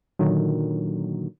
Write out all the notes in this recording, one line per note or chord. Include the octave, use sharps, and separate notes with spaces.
A#2 D3 D#3 F#3